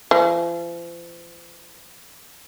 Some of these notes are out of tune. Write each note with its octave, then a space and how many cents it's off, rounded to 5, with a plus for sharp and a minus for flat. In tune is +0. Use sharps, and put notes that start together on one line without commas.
F3 -40